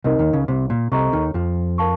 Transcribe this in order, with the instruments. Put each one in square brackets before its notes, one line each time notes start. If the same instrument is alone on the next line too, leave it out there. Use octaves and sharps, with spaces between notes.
[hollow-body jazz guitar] C2 C3 [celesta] D#4 A#4 D#5
[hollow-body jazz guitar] D#2 D#3
C#2 C#3
C2 C3
A#2
[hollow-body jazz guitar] C2 C3 [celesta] A4 D#5 A#5 C#6
[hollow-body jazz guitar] D#2 D#3
F2 F3
[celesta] A#4 F5 A5 C#6